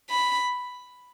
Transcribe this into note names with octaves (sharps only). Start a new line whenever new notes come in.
B5